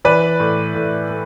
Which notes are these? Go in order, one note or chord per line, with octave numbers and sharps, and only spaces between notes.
E3 B4 D5
A2
A2
A3